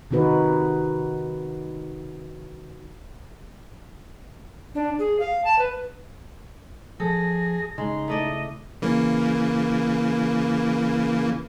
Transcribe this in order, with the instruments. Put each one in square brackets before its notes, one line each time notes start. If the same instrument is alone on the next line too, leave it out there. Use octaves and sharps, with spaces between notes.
[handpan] C3 D#3 D#4 F#4 B4
[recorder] D4
G#4
F5
A5
B4
[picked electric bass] F3 [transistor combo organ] G#4 [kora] A4 [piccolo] A#6
[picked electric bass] C#3 [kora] G#3 [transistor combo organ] D#4 [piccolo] C6
[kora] A3 E4 D5 [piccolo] D#5
[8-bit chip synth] C#3 E3 A#3